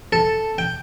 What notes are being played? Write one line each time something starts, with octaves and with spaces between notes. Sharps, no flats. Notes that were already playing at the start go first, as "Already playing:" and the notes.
A4
G5